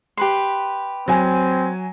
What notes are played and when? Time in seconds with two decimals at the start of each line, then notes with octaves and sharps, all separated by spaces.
0.17 G4 B4 C6
1.08 F#3 C4 G#5